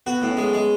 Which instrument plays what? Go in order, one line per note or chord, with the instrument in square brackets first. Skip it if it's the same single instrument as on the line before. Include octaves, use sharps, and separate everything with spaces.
[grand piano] B3 [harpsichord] F#4
[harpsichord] A2
[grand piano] C#4
[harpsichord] G#3
G#3